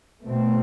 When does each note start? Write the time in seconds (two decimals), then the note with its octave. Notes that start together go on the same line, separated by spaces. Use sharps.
0.22 B2 A3 C4